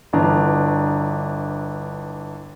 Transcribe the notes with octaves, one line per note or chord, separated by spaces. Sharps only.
G1 E3 D4 A#5